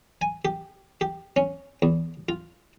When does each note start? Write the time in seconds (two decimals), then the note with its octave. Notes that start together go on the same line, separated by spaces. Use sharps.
0.21 G#5
0.45 G4
1.01 G4
1.36 C#4
1.82 E2
2.29 F4